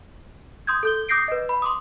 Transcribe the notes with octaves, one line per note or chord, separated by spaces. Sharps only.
C6 D#6 G6 G#6
A4 G6 G7
D6 D#6 G6 A#6 C7 D7
B4 D#5
B5
C6 D6 D#6